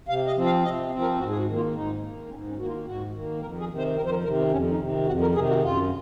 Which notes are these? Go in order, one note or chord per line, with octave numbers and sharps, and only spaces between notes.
C3 F5
D#5
F3 C4
F5
C3 D#5
F3 C4
A#4
G#2 F#4
G#4
F#4
D#3 A#3
F4
G#2 D#4
D#3 A#3
G#2 C#4
C#4
D#3 A#3 F#4
F4
G#2 F#4
D#3
A#3
F2 A#4
G#4
C3 D#3
C5
F2 A#4
C5
A#4
C3 D#3 A#4
C4
F2 C#4
D#4
C3 D#3
F2 F#4
A#4
C3 D#3 G#4
F#4
F#2 F4